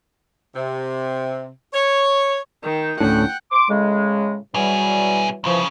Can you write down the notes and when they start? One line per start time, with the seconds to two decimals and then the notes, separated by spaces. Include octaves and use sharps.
0.55 C3
1.73 C#5
2.63 D#3 G5
3.00 D2 A2 C#4 D4 F#5 G5
3.51 C6 D6
3.68 A2 C#3 G#3
4.54 B2 E3 F#3 G3 G#4
5.44 C2 C#3 E3 F3